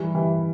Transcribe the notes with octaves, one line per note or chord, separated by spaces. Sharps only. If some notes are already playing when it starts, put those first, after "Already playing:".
Already playing: E3 G3
E3